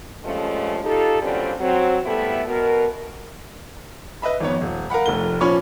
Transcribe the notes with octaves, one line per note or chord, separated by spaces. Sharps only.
G2 A#2 F3 G#3 A3 C#4
D#4 F4 G4 A4
F#2 A#2 D3 G3 C4 C#4
F#3 C4
G3 A3 B3 E4 A4
B2 A#4
B4 D#5 E5 B5
G#1 F2 B3 C#5
D#1
A#4 F5 F#5 B5
F1 F2 A3 G7
A#2 F3 C#4 C#5 B5 C#6